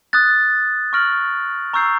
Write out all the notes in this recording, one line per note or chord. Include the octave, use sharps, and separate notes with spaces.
D#6 F#6 A6
C#6 F6 A#6 D7 F#7
A#5 C#6 E6 G6 C7